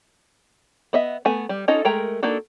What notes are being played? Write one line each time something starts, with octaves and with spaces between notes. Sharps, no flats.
B3 D#5 E5
A3 B3 G#5
G3
C#4 D#4 F4 A4 D#5
G#3 A3 A#4 G5 A#5
A#3 D4 D#4 F#4 A4